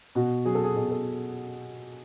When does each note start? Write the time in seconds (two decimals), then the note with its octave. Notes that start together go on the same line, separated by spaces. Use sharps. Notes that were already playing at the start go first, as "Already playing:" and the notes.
0.15 B2 F#4
0.45 F#3 G#4
0.55 A4
0.64 G#4
0.76 B2 G#4
0.91 A4